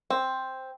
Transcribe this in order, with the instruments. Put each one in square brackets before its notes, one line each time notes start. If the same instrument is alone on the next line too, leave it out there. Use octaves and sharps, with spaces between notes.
[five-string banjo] C4